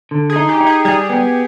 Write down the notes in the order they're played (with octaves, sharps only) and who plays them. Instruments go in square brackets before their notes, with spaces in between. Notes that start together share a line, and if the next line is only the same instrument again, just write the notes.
[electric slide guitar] D3
[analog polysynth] G#4
[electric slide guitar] D#4
[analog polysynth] G4
[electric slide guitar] D#4
[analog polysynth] G#4
[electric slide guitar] G3 [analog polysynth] G#4
[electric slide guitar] B3